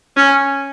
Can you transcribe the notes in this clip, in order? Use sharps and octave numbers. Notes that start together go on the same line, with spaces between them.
C#4